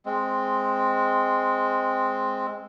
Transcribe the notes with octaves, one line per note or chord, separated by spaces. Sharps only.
G#3 C4